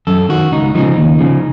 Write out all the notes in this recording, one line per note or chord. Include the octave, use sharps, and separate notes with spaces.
F#2 A4
D#3 F#4
C#2 D#4
C#3 F3 D#4
D#2
C#3 F3